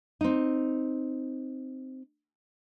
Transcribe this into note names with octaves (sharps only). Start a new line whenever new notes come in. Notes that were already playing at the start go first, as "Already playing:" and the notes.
C4 D#4